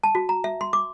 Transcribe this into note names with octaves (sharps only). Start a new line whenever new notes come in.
A5
F#4
A#5
E5
C6
D6